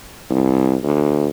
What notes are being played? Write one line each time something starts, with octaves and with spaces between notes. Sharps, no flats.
C2
D2